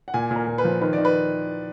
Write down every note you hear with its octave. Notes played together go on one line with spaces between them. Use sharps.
F#5
A#2 G#5
A#2
A#4
A#2
B4
F3
D#3 B4
D5
D#3
B4